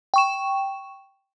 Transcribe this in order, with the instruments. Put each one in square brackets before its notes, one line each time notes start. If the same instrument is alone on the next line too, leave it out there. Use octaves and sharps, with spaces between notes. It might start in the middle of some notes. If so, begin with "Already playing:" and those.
[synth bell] G5 C#6 E7